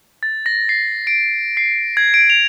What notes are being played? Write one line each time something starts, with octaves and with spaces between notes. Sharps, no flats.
A6
A#6
C7
D7
C7
G#6
D7
F7